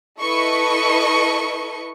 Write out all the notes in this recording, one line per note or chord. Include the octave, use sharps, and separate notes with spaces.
E4 A4 B4 D#5 C#6 C#7